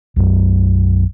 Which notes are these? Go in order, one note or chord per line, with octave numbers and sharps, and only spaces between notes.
B1 F#2 F#3